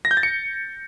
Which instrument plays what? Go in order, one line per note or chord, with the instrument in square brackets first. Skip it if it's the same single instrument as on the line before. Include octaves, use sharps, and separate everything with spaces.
[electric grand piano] A#6
G6
A6
C#7